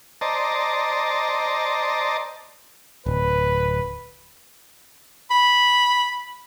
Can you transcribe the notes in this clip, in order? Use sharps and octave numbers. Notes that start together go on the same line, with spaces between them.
C5 D5 D#5 A5 A#5
D1 B4
B5